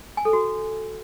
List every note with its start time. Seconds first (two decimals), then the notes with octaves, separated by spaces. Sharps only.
0.17 G#5
0.25 A4
0.33 F#4